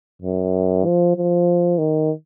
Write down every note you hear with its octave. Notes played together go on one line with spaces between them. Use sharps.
F#2
F3
F3
D#3